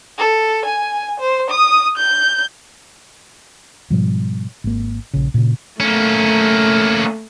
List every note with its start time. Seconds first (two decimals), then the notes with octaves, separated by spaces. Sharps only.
0.18 A4
0.65 G#5
1.20 C5
1.51 D#6
1.98 G6
3.90 G#2 B2 F3 G3
4.64 G#1 A#3
5.14 A#1 C#3
5.34 A#2 C#3
5.80 A3 A#3 C#4